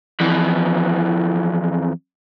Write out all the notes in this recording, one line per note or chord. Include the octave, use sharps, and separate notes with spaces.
F2 E3